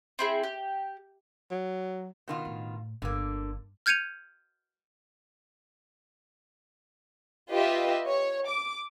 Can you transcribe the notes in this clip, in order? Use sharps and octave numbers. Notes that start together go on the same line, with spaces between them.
C4 E4 G#4
G4
F#3
B2 D#3 F4
A2
G1 D3 A#3
F6 G6 G#6 C#7 D#7 F7
F4 G4 B4 D#5 E5
C#5
D6